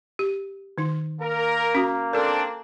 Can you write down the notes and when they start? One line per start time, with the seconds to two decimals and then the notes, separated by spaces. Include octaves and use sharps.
0.19 G4
0.78 D#3 D#4
1.21 A#3 A#4
1.75 C#4 F#4
2.13 C4 D4 A4 A#4